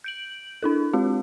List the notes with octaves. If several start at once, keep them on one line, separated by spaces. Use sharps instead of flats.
G6 D7 F#7
D4 E4 A4
G#3 C4 F4 G4